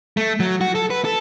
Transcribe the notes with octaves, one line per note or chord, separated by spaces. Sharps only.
A3
F#3
F#4
A4
B4
A4